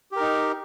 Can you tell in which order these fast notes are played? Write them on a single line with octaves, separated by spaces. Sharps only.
G4 A#4 D#4